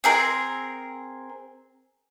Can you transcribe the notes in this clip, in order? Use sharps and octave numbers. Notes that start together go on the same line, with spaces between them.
C4 G#4 A#4